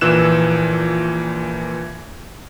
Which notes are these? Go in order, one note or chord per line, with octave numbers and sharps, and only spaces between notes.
A#1 A#2 E3 E6 F#6 E7